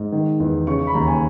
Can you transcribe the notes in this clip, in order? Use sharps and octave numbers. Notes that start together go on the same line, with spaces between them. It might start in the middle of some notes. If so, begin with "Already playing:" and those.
Already playing: G#2
D#3
E2
C#3 C#6
C#6
B5
D#2 A#5
G#5